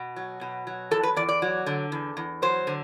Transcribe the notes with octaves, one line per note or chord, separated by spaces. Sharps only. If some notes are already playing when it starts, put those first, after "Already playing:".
Already playing: B2
F#3
B2
F#3
E2 A4
B4
E2 D5
D5
F#3
D3
E2
E2
F#3 C5
D3